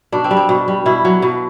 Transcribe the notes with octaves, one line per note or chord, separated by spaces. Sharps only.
B2 D4
C4
G3
C4
B2
G3
B2 E4
F#3
B2